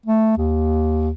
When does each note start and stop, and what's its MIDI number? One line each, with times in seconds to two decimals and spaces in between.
0.06 0.36 57
0.38 1.10 39